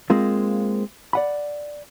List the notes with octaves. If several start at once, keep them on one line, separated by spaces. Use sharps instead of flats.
G#3 A#3 C4 F4
D5 F#5 B5